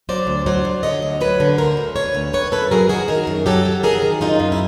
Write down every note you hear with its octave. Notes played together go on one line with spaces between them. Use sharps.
F#3 C5 D5
D2
F#3 C5 D5
F#3
D3 C#5 D#5
D2
F#3 B4 C#5
D3
D2 A#4 C5
D2
D2 B4 C#5
D2
D#3 B4 C#5
F#2 A4 B4
F#3 G#4 A#4
D#3 F#4 G#4
D#3 G#4 A#4
F#2
F#3 G4 A4
F#3
D#3 G#4 A#4
D#3
F#2 D#4 F4
F#2
E4